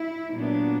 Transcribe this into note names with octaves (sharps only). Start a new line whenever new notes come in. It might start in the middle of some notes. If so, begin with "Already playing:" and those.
Already playing: E4
A#2 F#3 B3 D4